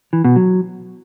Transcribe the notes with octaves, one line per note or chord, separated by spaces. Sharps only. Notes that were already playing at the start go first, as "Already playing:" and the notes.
E3
B2
F#3